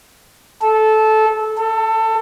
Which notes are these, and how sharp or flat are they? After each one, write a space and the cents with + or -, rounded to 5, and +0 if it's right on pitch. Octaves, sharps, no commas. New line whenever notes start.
A4 -15
A4 +20